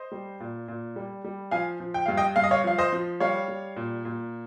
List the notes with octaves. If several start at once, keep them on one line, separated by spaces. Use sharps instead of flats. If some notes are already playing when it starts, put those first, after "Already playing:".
Already playing: C5 D#5
G3
A#2
A#2
G3
G3
F3 F5 G#5
F3
G5
G2 F5
D#5 G5
G2 F5
D#5
C#5 F5
F3 F5
C5 D#5
F3
G3 C#5 F5
G3
A#2
A#2